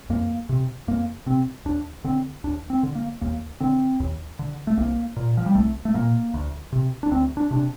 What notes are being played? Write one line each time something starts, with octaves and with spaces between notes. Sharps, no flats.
F2 A#3
C3
F2 A#3
C3 C4
D#2 D4
D3 C4
D#2 D4
C4
D3
A#3
D#2 A#3
D3 C4
D#2
D3
A3
C2 A#3
A#2
F3
G3
C2 A3
A3
A#2 A#3
D2
C3
D4
D2 C4
D4
C3 D4